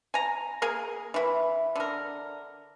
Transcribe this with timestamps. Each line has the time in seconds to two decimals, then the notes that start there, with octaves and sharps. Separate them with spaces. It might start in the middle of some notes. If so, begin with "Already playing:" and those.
0.14 G#5 A#5
0.62 A#3 G#4 A#4 G#5
1.14 E3 E4
1.76 D3 A#4